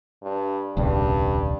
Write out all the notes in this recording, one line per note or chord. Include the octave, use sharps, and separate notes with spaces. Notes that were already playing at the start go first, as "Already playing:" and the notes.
G2
D#1 C2 G2 C#3